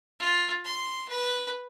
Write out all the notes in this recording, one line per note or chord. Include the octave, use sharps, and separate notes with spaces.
F4
C6
B4